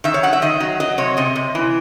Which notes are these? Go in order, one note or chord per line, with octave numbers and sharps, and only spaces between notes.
D#3 E5
C#5
F#3 F#5
E5
D#3 D#5
F#3
F#3 D#5
C3 C#5
C3 D#5
C3
E3